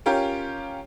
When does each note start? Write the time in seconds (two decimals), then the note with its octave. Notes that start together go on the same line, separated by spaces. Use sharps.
0.06 C#4 F4 G4 A#4